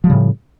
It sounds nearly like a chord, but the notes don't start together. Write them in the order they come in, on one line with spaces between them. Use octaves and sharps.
F3 G3 C#3 A2